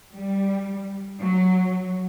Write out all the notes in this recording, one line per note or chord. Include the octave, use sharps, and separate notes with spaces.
G3
F#3